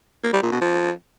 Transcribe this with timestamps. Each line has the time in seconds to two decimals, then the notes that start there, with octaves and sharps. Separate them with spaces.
0.24 A#3
0.33 G3
0.42 A#2
0.52 B2
0.61 F3